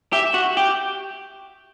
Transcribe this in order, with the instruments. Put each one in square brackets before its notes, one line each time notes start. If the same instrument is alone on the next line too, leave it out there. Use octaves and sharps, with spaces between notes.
[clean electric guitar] G4 [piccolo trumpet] E5
[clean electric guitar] F#4
[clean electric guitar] G4 [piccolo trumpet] G5